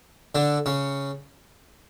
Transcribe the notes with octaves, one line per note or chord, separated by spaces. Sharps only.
D3 D4
C#3 C#4